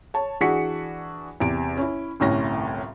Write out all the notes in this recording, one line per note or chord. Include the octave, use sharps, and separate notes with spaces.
C#5 A5
E3 D4 F#4 G#4 B6 C#7
E2 C3 D7
C#4 E4
G1 C2 A2 C#4 A#6